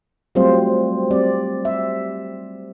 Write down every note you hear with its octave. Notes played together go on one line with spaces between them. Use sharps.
F#3 G3 A3 C4 F4 C5
G3 C4 D5
E5